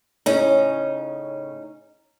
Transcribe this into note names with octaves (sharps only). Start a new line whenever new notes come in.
A2 C#3 C#4 D#4